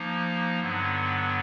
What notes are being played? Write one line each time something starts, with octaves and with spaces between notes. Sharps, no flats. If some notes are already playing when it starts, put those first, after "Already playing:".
Already playing: F3 A#3 D#4
G2 D3 F#3 B3